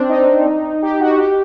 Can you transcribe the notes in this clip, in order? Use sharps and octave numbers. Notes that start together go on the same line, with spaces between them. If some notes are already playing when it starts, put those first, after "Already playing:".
Already playing: C4 D4
D#4
G4
F#4
G4